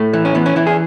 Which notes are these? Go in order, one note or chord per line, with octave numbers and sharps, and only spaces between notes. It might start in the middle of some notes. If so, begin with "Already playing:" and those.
Already playing: A2 A3
E3
C#4
E3 B3
C#4
E3 E4
G#4